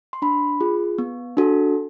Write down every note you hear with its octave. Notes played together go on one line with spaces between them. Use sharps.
C6
D4 B5
F4 G#4
B3
D4 F#4 A4